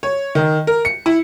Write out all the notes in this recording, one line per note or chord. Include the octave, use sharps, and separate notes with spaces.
C#5
D#3
A#4
C#7
E4